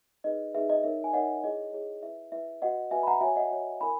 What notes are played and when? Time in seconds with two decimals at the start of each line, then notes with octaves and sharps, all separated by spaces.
0.24 D#4 G#4 B4 D#5
0.54 D#4 G#4 B4 E5
0.70 D#5
0.84 D#4 A#4 C#5 E5
1.04 G#5
1.13 D#4 A#4 C#5 D#5 F#5
1.44 E4 G#4 C#5 D#5
1.73 E4 G#4 C#5
2.03 E4 B4 E5
2.32 E4 B4 E5
2.62 F#4 B4 D#5 F#5
2.91 F#4 B4 E5 G#5
3.03 B5
3.07 F#5 A#5
3.21 F#4 C#5 E5 G#5
3.36 D#5 F#5
3.51 F#4 C#5
3.80 E4 A#4 G#5 B5